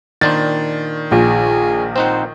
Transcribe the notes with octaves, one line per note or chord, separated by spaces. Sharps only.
A#2 D#3 D4 C5 A6
A#1 G#4
C4 D#4 C5 F#5